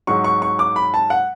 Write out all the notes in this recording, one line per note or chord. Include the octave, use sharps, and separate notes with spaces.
G#2 F#3 C#6
C#6
C#6
D6
B5
A5
F#5